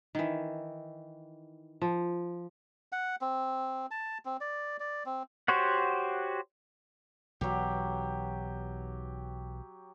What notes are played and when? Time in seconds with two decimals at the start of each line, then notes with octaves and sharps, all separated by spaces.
0.15 D#3 E3
1.82 F3
2.92 F#5
3.21 C4
3.91 A5
4.25 C4
4.41 D5
4.80 D5
5.06 C4
5.48 F#4 G4 C5 C#5 F#5
7.41 B1 E3 F#3 G4